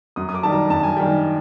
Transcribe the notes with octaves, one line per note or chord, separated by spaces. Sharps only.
F#2 D#6
D#6
D6
D#3 G3 A5
A#5
F#2 A5
G#5
D#3 G3 G5